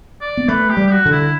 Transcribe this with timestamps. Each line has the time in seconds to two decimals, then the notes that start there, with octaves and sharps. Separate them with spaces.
0.21 D5
0.37 B3
0.48 A3 B4
0.70 G4
0.77 G3
0.86 G4
0.91 F#4
1.06 D3
1.11 E4